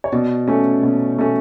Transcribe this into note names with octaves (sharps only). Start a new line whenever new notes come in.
C#5
B2 D5
A3 C#4
B2
A3 C#4